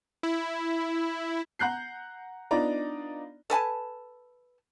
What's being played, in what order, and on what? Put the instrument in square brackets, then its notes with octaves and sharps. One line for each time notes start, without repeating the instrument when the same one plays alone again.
[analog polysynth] E4
[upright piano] F#5 A#5 F#6 G6 C7
B3 D4 D#4 F4 D5 A#5
[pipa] A4 B4 G#5 A5